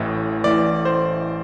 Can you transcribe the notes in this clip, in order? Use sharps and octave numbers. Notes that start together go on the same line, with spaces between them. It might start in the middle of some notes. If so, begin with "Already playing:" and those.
Already playing: A1 A2 E3
A1 A2 E3 D5
C5